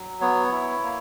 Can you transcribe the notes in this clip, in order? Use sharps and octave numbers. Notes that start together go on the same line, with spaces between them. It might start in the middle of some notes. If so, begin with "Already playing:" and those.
Already playing: F#3
B3 C#5
E4
A#3